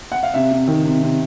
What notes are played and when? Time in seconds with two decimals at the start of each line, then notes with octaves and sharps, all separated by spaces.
0.12 F#5
0.23 F5
0.34 C3 E5
0.51 C3
0.68 D#3
0.85 C3
1.02 C3